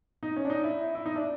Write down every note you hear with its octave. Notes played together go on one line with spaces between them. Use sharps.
D#4
C#4
D4
D#4
E4
E4
D#4
D4